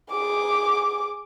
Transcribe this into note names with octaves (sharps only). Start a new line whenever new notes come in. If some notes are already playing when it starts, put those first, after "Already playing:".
G#4 D6